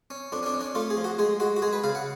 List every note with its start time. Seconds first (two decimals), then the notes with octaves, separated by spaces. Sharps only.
0.10 C#4
0.32 F2 D4
0.43 C#4
0.46 D4
0.54 C#4
0.61 D4
0.75 A3 F4
0.90 G#4
0.97 F3
1.04 F#4
1.19 G#3 G#4
1.40 G#3 F#4
1.57 F#4
1.62 G#3 G#4
1.73 B4
1.84 C#3 F5
1.95 F#5